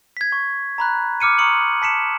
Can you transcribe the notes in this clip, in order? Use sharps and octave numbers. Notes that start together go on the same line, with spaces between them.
G#6 B6
C#6
A#5 B5 F#6
D6 F6 C#7 D#7
A#5 C6 C#6 D#6 C#7 F#7
A5 B6 C#7 E7